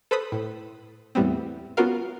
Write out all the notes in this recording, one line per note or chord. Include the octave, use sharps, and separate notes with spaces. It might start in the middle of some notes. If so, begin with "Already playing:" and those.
A4 B4 C5 B5 D#6
A2
E2 A2 G3 B3 C4
B3 C#4 F4 F#4 A#4 F5